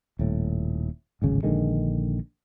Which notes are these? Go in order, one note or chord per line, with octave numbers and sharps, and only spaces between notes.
D#1 A2
D1 G#1 C#3
A#1 D3 D#3 G#3